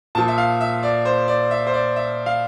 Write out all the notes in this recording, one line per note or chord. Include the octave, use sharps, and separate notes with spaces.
A#2 F3 A5
E5
F5
E5
D5
C5
D5
E5
C5
D5
E5
F5